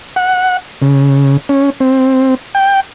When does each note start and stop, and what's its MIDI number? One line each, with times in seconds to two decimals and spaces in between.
0.16 0.57 78
0.82 1.37 49
1.49 1.70 61
1.80 2.35 60
2.55 2.80 79